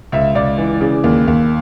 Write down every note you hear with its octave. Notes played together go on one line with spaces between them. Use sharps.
C#2 E5
C#2 D5
E3
C#3
D#2
D#2